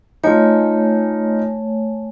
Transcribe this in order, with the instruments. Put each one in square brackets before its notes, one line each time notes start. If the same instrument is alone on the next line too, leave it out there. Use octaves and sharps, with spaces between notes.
[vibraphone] A3 C#5 G#5 [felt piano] D#4 F4